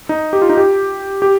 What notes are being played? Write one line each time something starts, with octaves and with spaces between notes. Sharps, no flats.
D#4
G4
F4
D#4
G4
G4